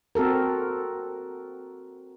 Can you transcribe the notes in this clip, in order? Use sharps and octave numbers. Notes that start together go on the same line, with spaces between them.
C4 F#4 A4 A#4